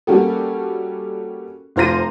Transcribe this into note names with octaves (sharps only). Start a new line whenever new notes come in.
G3 A#3 C#4 F#4 G4 A4
F1 F4 C5 A#5 A#6 D#7